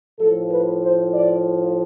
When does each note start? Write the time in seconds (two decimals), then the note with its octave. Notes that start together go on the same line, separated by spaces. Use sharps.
0.20 A2 F3 A4
0.50 B4
0.82 C5
1.13 D5